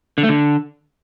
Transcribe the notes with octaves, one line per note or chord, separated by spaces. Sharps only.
D3
A3
D3